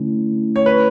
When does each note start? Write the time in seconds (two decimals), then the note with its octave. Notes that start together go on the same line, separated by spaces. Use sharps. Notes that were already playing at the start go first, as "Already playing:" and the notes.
Already playing: D3 A3 C#4 E4
0.56 C#5
0.66 B4